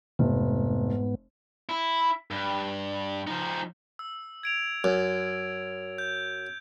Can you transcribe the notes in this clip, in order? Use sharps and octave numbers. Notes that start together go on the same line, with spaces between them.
F1 G#2 B3
E4
G2
F3 D#4
E6
G#6 D7 F7
F#2
G6